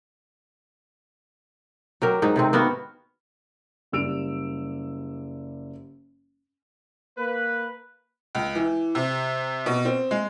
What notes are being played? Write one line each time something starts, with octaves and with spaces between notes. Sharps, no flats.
F#3 G4 A#4
G#2 F#3 D#4
C3 D#3 C4
A#3 B3 F#4 A#4
F#1 G3 E6 D7 F7
A#3 B4
C#2
E3
C3
B2
C4
G#3